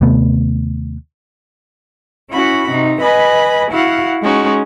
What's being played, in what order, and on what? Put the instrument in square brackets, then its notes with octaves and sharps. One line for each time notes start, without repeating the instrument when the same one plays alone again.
[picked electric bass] D#2 C3 A3 B3
[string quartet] C#4 E4 F#4 B5
C3 D#4
B4 D#5 G#5 B5
E4 F#4 F5 F#5
G#3 C#4 D#4 F#4